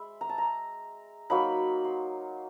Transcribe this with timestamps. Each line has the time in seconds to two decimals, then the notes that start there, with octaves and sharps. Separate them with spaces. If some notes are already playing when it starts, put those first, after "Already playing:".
Already playing: G#3 E5 B5
0.21 A#5
0.29 A5
0.38 A#5
1.30 F#3 A#3 D#4 B5
1.84 C6